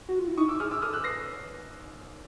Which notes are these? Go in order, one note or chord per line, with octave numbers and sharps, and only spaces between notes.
F#4
F4
E4
D#4 C#6 D#6
D6 E6
G#4 D#6 F6
D6 E6
A4 D#6 F6
E6 F#6
B4 A#6 C7